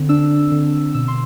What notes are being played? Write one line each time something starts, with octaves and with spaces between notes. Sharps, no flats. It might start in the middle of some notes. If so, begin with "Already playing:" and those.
Already playing: D3 C4
D4 E6
D3
B2 E6
C6